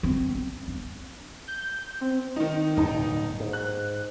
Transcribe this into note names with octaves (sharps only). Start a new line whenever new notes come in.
B3 C4
C4
D4
G6
C4
D#3 D#4
D1 G2 B2 D#4
G#2
F#6